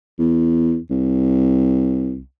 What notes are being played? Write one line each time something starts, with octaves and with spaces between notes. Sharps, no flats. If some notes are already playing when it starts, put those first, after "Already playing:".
E2
C2